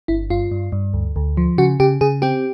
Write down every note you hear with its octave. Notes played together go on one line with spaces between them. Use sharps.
G1 E4
G2 F4
G2
G2
D2
D2
F3
C#3 F#4
C#3 G4
C#3 G#4
C4 G4